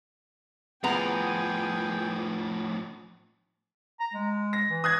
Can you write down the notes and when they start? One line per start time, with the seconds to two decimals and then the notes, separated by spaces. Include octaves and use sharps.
0.84 A2 F3 B3 G#4 G5 A#5
4.01 A#5
4.14 G#3
4.53 A#6
4.70 E3
4.84 D#6 F#6 G#6